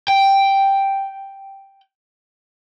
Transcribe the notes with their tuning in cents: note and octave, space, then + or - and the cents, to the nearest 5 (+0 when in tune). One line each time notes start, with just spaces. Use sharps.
G5 +0